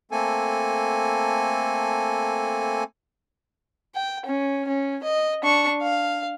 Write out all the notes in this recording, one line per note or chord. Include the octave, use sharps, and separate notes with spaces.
A3 A#3 C4 A4 G#5
G5
C#4
C#4
D#5
D4 C#6
F5